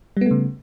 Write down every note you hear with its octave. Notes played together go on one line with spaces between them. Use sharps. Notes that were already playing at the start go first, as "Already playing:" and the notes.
C#3 G3 A3 B3